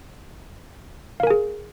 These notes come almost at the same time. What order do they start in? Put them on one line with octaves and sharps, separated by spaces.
F5 A#4 G#5 G#4